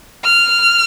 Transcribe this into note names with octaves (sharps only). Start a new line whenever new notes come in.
F6